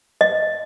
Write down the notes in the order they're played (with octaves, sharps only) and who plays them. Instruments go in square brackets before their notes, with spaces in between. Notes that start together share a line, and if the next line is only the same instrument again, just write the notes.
[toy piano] D#5